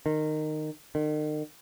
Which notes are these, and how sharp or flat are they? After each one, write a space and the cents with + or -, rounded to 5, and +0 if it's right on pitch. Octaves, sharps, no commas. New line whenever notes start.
D#3 -15
D#3 -40